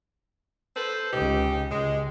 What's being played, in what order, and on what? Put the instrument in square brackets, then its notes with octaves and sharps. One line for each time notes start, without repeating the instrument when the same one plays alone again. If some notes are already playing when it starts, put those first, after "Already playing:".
[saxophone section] A4 B4 C5
[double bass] C#2 C#3 [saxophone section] D#4 G4
[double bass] C#2 [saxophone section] G#3